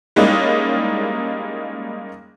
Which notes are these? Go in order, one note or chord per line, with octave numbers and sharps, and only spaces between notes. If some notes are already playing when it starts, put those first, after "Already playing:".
G3 G#3 A#3 C#4 D#4 E4